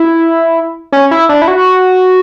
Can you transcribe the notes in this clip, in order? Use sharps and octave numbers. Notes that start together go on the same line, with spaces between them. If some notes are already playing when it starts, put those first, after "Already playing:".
Already playing: E4
C#4
E4
D4
E4
F#4